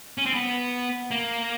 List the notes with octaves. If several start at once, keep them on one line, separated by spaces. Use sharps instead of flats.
C#4
C4
B3
A#3